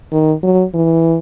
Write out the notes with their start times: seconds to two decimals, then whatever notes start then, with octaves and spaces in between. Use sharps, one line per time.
0.12 D#3
0.43 F#3
0.74 E3